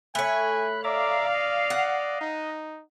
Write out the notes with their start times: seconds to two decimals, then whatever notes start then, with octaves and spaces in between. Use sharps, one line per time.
0.15 A3 C#5 G#5 B5 F#6
0.84 D5 E5 F5 A#5 D6
1.34 D#5
1.70 F#5
2.21 D#4